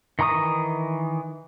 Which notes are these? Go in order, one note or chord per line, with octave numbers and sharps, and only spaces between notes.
D#3 E3 A#5 C#6 D#6